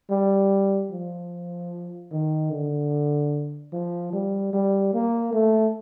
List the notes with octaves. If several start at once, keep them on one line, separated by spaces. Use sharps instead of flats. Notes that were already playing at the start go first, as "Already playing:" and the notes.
G3
F3
D#3
D3
F3
G3
G3
A#3
A3